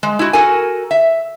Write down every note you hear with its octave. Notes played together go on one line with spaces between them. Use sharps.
G#3
E4 F#4
F#4 A4 A#4 G#5
E5